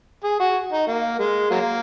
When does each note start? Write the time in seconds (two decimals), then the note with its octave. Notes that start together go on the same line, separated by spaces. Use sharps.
0.24 G#4
0.40 F#4
0.72 D#4
0.87 A#3
1.19 G#3
1.50 F#3 A#3